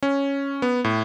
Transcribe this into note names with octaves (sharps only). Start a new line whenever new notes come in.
C#4
B3
A2